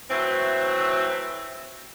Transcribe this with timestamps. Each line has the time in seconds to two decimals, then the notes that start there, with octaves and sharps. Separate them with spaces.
0.11 E3 F#3 A3 C4